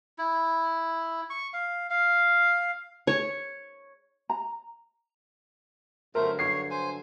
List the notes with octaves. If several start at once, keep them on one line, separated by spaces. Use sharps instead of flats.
E4
C#6
F5
F5
C#5
A#5
G2 D3 F#3 A3 A#4 C5
C#5 C7
C5 G#5